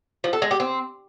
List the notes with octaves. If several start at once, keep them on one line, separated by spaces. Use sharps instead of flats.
F3
A4
G#3
G4
C4